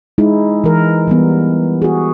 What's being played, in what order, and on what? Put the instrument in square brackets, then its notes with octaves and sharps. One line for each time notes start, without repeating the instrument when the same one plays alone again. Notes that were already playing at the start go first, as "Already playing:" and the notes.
[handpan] G#3 D#4 E4
E3 A#4
E3 G3 B3
F#4 G#4